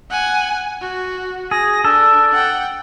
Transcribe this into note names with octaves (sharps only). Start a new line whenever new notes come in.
F#5 G#5
F#4
G#4 A#6
D4 A4
F#5 G5